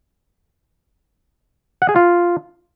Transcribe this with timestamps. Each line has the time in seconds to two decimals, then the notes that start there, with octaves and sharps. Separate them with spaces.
1.82 F#5
1.89 G#4
1.96 F4